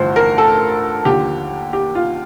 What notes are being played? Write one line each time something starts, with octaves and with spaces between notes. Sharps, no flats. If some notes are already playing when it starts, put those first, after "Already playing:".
Already playing: A1 G2 D3 F3 C5
A#4
A4
D#2 D3 F3 G4
G4
F4